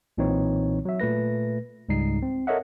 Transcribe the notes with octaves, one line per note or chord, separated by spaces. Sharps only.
B1 A#2 E3 C4 D#4 C#5
F#3 E5
A#2 A3 B4 A#6
C#2 G#2 G3 D#4 C7
C4
A4 A#4 C#5 D#5 E5 F#5